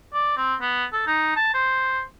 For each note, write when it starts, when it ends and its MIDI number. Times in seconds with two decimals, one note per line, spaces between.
0.14 0.34 74
0.37 0.55 60
0.61 0.85 59
0.93 1.03 69
1.07 1.32 63
1.36 1.53 81
1.54 2.01 72